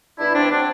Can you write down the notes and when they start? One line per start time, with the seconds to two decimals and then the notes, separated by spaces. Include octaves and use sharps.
0.19 E2 D4 E4
0.34 E2 C4 D4
0.50 F#3 C4 D4